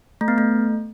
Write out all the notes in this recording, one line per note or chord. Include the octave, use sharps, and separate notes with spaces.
A3
B3
A3